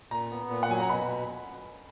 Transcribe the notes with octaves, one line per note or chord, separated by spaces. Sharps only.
A#2 A#5
B3
A#2
F#5
F#3 G#5
A#5
B2 B5